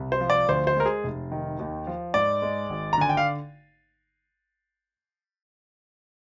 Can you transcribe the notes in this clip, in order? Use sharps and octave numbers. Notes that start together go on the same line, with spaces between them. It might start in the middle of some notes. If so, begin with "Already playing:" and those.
Already playing: C2
C5
F3
D5
D2 C5
C5
G#3 A#4
G#4
F1
D#3
D#2
F3
G#2 D5
G#3
G#1
A#5
D3 G#5
G5
F5